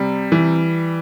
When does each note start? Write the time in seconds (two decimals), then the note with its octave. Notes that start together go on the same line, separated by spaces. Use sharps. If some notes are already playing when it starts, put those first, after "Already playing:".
Already playing: C3 G3
0.32 E3